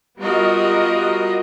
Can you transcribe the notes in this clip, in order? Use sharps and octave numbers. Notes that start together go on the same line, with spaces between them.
G3 B3 F4 F#4 A#4 D#5